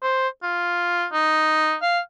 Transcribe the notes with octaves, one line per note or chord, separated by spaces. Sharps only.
C5
F4
D#4
F5